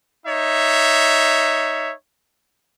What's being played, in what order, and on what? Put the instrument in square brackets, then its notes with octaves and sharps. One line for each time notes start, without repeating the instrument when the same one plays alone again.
[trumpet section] D#4 C#5 E5